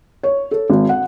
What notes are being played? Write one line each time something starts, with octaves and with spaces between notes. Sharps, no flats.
C#5
A4
G#1
F#5